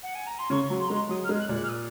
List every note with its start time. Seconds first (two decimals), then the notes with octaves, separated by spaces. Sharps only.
0.03 F#5
0.15 G#5
0.26 A#5
0.39 C6
0.50 C#3 C#6
0.70 F#3
0.80 C6
0.87 G#3 A#5
0.95 C6
1.09 F#3 D#6
1.24 F6
1.29 G#3
1.39 F#6
1.49 A#2
1.54 F#6
1.63 F6
1.69 D#6